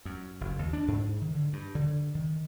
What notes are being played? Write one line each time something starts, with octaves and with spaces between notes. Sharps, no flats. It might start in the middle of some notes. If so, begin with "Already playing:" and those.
F#2
F#1
D#2
D4
G#2
D#3
D3
G2
D3
D#3